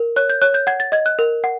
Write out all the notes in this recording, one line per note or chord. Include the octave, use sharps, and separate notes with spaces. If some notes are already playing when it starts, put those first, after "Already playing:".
Already playing: A#4
C#5 F#6
G6
C#5 F#6
G6
F#5 G#6
A6
D#5 G#6
F#6
A#4
F#5